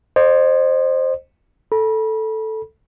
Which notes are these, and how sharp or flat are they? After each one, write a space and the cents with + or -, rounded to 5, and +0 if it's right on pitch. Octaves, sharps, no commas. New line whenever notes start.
C5 +10 D#5 -35
A4 +0 B5 -35